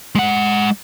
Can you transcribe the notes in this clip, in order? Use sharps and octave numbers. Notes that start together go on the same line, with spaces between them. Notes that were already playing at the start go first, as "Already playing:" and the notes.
G#3 F#5